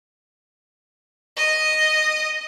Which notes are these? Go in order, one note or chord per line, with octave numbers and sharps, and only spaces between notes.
D#5 D#6